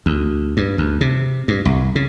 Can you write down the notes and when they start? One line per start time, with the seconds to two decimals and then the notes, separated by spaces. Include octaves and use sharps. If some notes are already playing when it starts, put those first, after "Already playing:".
0.06 D2
0.57 G2
0.78 D2
1.01 C3
1.48 G2
1.65 C2
1.95 C#3